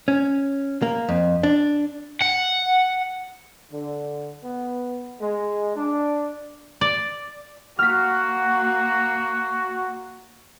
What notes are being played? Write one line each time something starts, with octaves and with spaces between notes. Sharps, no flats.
C#4
A#3
F2
D4
F#5
D3
B3
G#3
D4
D5
A#3 F#4 F6 B6